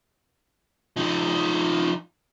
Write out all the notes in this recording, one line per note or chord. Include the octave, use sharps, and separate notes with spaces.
F3 D#4